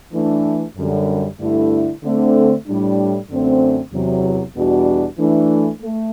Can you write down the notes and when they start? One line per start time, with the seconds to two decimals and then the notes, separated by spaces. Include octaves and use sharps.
0.13 E3 A3 D4
0.77 F#2 D3 G3
1.39 G2 D3 A3 E4
2.03 D3 A3 C4
2.66 A2 G3 D4
3.29 F#2 D3 A3 C4
3.93 E2 C3 F#3
4.56 E2 B2 G3 D4 F#4
5.18 E3 A3 D4
5.82 A3